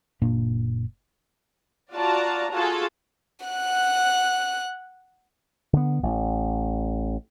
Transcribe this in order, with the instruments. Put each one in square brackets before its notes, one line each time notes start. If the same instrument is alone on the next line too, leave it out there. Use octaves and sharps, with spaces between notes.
[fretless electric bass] F#1 A#2 A#3 D4
[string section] F4 F#4 D5 A5 A#5
F4 F#4 G#4 A4 A5
[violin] F#5 F#6
[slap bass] D3 B3
A1